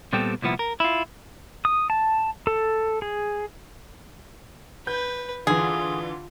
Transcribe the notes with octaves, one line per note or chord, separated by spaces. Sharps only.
A#2 G3 B3 C4 G4 A4
C2 A#2 F3 B3 E4
A#4
E4 F4
D#6
A5
A4
G#4
B4 G6
D3 E3 F4 G#4